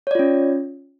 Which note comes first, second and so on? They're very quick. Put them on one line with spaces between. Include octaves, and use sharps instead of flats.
C#5 D5 F4 C#4